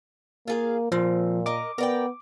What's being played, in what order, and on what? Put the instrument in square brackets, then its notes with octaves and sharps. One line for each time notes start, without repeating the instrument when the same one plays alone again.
[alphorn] A#3 [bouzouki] F4 G#4 F5
[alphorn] A#2 [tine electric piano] F3 [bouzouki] C4
[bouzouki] A#4 D#5 [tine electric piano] D6
[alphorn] B3 [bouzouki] A#4 D5 G5